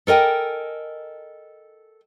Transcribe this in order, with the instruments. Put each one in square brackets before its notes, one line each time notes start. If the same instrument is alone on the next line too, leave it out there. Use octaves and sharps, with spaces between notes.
[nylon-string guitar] A4 A#4 D#5 G5 G#5